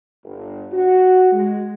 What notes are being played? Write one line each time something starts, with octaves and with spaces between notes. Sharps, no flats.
G1
F#4
G#3